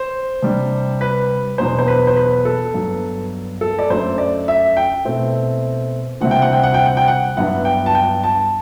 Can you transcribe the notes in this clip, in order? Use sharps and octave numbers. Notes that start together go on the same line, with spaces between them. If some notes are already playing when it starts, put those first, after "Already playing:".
Already playing: C5
C3 G3 D4
B4
E2 B2 F#3 B3 D4 C5
C5
B4
C5
B4
A4
G2 F#3 B3
A4
D5
F#2 F#3 A3 D4 C5
D5
E5
G5
B2 A3 C4 E4
D2 C3 G3 C4 E4 F#5
G5
F#5
G5
F#5
G5
F#5
G5
F#5
G2 F#3 B3 E4 F#5
G5
A5
G5
A5